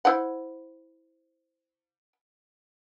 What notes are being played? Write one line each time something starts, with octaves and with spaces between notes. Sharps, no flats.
E4 C5 F#5